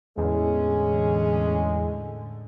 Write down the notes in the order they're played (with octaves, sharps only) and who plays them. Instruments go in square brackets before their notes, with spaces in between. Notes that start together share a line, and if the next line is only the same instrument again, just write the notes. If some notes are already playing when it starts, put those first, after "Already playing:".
[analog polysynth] E2 [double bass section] A2 D3 [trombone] G#3 [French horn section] C#4 G#4